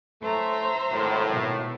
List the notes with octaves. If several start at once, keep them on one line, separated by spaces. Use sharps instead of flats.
A2 A3 C5 E5 A#5
G#1 A2
B2